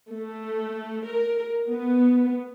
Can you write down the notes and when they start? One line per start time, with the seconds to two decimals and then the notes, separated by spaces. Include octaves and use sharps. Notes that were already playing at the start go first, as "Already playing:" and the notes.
0.11 A3
1.05 A#4
1.69 B3